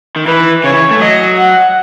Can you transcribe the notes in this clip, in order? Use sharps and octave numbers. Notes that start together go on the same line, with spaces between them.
D#3
E3 B4
C#3 C#5
E3
A3
F#3 D#5
F#5